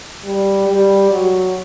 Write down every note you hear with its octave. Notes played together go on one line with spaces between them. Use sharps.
G3
G3
F#3